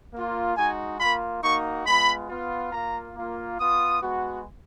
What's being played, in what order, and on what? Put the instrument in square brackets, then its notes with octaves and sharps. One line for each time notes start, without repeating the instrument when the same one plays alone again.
[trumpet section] A#3 F4
G#3 D#4 F#4 G#5
A#3 F4 B5
A#3 D#4 F#4 C#6
G#3 B3 F4 B5
B3 F4
A#3 F4 A#5
A#3 F4
B3 F4 D#6
G#3 B3 F#4